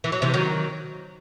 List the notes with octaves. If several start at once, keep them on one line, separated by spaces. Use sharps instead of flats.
E3
F#3
C3 E3
D#3 F#3